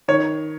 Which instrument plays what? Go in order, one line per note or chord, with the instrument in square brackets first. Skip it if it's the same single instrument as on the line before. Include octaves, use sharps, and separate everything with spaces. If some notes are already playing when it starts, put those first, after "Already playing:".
[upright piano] D#3 C#5